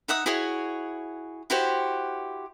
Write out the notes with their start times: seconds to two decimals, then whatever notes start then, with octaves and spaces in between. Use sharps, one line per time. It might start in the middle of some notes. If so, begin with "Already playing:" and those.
0.08 D#4 E5 F#5 D#6
0.26 E4 F#4 G#4 C#5
1.50 E4 F#4 G4 C5